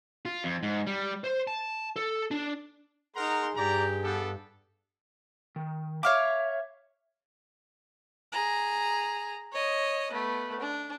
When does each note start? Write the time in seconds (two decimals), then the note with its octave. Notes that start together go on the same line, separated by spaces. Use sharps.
0.25 F4
0.44 F2
0.63 G#2
0.87 G3
1.24 C5
1.47 A5
1.96 A4
2.31 D4
3.16 D#4 G#4 A#4 F#5 A#5 C6
3.56 G2 G4 D5 A#5
4.04 B3 D4 A4
5.56 D#3
6.03 C#5 E5 F5 D6
8.32 G#4 A#5
9.52 C#5 D#5
10.12 A3 B3
10.60 D4